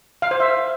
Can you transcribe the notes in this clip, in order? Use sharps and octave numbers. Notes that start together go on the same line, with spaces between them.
F5
C5
E5